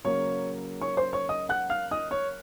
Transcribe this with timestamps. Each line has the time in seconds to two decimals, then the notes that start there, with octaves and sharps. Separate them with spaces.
0.04 C#3 F#3 A#3 C#4 C#5 C#6
0.82 C#5 C#6
0.97 C5 C6
1.13 C#5 C#6
1.29 D#5 D#6
1.49 F#5 F#6
1.70 F5 F6
1.91 D#5 D#6
2.11 C#5 C#6